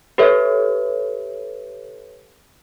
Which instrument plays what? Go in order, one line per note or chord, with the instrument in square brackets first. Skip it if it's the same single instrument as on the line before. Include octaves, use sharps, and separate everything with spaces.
[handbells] G4 A4 B4 C#5 E5